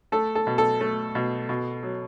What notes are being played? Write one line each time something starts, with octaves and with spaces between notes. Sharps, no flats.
A3 A4
A4
B2
A4
A3
B2
B2
F#3